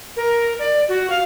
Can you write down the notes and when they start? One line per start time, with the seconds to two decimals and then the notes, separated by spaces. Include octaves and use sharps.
0.17 A#4
0.59 D5
0.89 F#4
1.10 F5